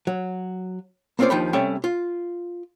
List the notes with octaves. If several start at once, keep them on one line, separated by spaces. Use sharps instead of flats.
F#3
A#3 C4 C#4 F4 C5 D5
D#2 F3 D4 D#4 G5 B5
C3 G3 A3 C#4 G5
F4